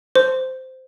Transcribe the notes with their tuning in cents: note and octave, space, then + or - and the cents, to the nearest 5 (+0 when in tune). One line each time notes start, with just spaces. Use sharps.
C5 -10